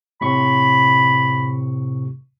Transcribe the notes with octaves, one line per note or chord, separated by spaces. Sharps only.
A2 C3 B5 C#6